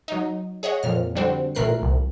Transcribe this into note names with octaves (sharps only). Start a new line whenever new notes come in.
F#3 D#4
G#4 C#5 D#5 F#5
F2 A#2 F6
D3 G3 C4 D4 F#4
A1 A#2 A3 A#4 F#6 C7
C2